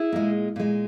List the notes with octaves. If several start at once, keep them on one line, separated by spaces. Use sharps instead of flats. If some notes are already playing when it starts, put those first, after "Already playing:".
Already playing: E4 G#4
A#2 G#3
A#2 G#3